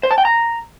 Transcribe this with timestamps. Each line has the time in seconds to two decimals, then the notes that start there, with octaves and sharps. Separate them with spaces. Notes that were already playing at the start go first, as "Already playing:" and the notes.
0.03 C5
0.11 A5
0.18 G5
0.25 A#5